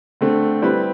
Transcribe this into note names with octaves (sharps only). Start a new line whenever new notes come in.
D3 A3 C4
G3 C4 E4 B4